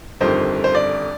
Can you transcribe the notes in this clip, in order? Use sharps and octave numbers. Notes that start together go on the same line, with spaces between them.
G1 F2 D#3 G3 C5
C5
D5